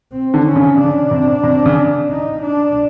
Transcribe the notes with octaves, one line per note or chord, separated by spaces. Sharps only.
C4
D3
C#4
C#3
C#3 D4
C3
C3
C#3
D#4
D4